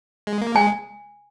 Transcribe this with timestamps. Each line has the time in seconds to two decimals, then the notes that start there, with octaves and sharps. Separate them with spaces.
0.27 G#3
0.41 A#3
0.56 G#3 G#5